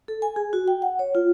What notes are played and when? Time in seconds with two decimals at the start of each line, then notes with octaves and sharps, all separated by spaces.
0.08 A4
0.22 G#5
0.36 G#4
0.53 F#4
0.68 G5
0.82 F#5
0.99 C#5
1.15 F4